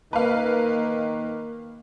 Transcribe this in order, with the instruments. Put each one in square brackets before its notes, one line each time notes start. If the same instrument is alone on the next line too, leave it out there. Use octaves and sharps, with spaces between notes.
[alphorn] D#3 [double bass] A#3 [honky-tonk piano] B4 F5